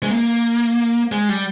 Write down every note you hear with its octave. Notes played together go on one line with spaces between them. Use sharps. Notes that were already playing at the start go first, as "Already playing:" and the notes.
G#3
A#3
G#3
G3